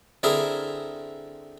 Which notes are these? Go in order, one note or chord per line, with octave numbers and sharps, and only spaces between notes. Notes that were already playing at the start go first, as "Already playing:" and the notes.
D3 C4 E4 G#4 A#4